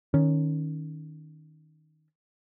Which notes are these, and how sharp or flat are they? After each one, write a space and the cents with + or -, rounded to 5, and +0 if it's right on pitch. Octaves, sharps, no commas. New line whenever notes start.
D#3 +0 C#4 +0